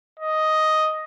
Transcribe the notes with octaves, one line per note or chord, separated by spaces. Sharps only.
D#5